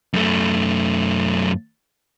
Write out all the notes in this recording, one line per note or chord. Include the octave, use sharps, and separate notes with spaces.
F#2 A3